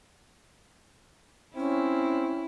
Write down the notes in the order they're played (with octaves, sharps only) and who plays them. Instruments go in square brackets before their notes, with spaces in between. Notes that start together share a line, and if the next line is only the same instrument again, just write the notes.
[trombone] C4 [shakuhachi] C#4 [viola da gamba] E4